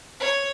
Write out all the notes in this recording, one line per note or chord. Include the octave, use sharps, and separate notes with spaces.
C#5